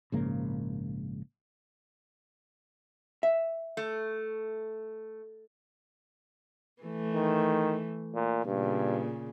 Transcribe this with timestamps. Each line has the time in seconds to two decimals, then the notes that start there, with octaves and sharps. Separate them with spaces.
0.12 A#1 G#2 C#3 A#3
3.23 E5
3.77 A3
6.82 E3 A3
7.14 D#3
8.15 A#2
8.46 G2 A#2 C#3